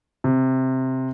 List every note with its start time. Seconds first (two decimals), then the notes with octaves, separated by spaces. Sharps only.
0.24 C3